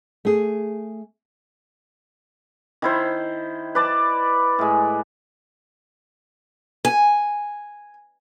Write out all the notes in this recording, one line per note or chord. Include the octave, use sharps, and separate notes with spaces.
A3 G#4
D#3 E4 C5
B4 D5 A5
A2 G#3
G#5